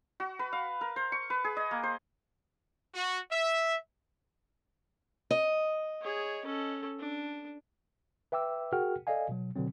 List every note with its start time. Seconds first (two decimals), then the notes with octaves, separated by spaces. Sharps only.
0.20 F#4
0.39 B4
0.53 F5
0.81 A#4
0.96 C5
1.12 C#6
1.30 B4
1.44 G#4
1.57 D#5
1.71 A#3
1.83 C5
2.95 F#4
3.32 E5
5.31 D#5
6.02 G#4 C#5
6.45 C#4 A4
6.99 D4
8.32 B4 E5 G5 D6 E6
8.73 F#4 G#4 A#4 F#5 G5 F6
9.07 A4 D5 D#5 F5 G#5
9.29 B2 F#3
9.56 B2 D3 F#3 C4